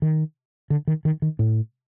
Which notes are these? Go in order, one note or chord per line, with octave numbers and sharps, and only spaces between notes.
D#3
D3
D#3
D#3
D#3
A2